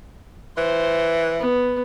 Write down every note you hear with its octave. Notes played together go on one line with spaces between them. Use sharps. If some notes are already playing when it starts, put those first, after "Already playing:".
E3 C5
B3